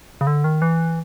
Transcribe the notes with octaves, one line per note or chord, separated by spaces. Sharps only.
C#3
D3
D#3
E3